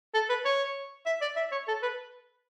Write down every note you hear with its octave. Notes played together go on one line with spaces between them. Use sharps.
A4
B4
C#5
E5
D5
E5
C#5
A4
B4